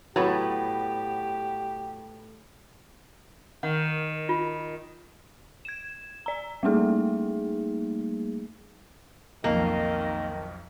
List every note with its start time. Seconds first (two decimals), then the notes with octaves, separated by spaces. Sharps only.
0.16 A2 F#3 B3 G4
3.63 D#3 F#5
4.29 F4
5.65 G#6 E7
6.26 D5 A#5
6.63 G3 A3 A#3 D#4 G#4
9.44 B1 F2 D#3 A#3 D#5